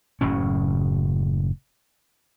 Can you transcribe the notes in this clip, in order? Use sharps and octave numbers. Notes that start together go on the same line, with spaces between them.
F#1 A2 C#3 C#4